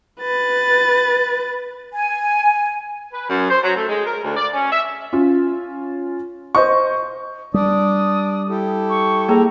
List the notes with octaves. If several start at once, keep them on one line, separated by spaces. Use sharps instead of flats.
B4 A6
G#5
B4
F#2
C5
F#3
A3
G#3
A#4
D2
D5
C#4
E5
C#4 F4
C5 D#5 C#6
G3 D4 D5 D#6
E4 G4 A4
C#6
A#3 G#4 A#5